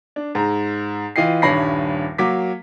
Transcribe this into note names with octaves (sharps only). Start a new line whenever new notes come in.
D4
G#2 A#5
E3 F4 D#5 G5 C7
D#1 G2 C#5 B5 A#6 C7
F#3 A#3 D6 B6